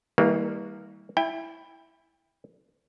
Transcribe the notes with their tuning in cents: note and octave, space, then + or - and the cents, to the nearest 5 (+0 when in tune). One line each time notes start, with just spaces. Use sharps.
E3 -40 G3 +25 A#3 -10
E4 +0 G5 +30